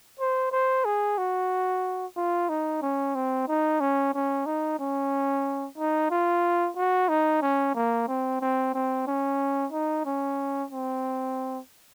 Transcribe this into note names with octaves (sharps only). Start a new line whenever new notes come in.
C5
C5
G#4
F#4
F4
D#4
C#4
C4
D#4
C#4
C#4
D#4
C#4
D#4
F4
F#4
D#4
C#4
A#3
C4
C4
C4
C#4
D#4
C#4
C4